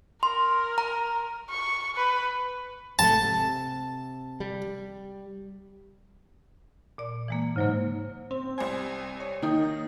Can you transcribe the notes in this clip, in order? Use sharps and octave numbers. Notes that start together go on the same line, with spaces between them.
A#4 C6
A#5
C#6
B4
G#2 C3 A3 A5
C3
G3
A#2 D5
E3 G#3 A#3
G#2 C#3 F#3 A#3
C4
C2 C4 G#5
C#5
D#3 A#3 D#4